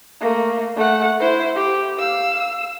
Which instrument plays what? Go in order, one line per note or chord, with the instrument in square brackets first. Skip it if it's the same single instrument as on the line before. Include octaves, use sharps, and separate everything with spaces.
[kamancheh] A3 A#3
A3 F#5
E4 C5
G4
F5 E6